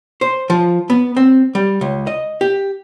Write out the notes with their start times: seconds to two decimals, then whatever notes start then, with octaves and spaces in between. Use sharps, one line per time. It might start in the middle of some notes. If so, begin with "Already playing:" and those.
0.21 C5
0.50 F3
0.90 B3
1.17 C4
1.55 G3
1.81 C#2
2.07 D#5
2.41 G4